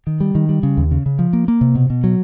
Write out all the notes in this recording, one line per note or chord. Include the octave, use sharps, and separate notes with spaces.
D#3
G3
D#3
G3
C#3
D#2
C#3
C#3
F3
A#3
A#3
C3
B2
B2
F#3